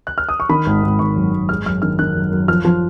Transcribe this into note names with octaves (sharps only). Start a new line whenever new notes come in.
F#6
F6
D#6
C#6
D#3 B5
G#1
G#1
G#1 C#6
F#2
G#1
G#3 F6
F#2 F6
D#3 F6
D#3 F#6
F#2
F#2
F3 F6
F3